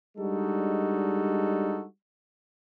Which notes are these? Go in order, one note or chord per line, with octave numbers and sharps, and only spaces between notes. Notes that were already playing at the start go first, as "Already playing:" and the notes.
G3 G#3 D4 D#4 F#4 A4